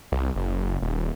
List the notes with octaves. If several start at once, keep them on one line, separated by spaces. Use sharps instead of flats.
C2
F#1
D#1